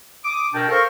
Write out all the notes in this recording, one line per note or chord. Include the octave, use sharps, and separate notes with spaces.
D6 D#6
B2 D4 A#4 G5
A4 A#4 C5 F5 A#5 C#6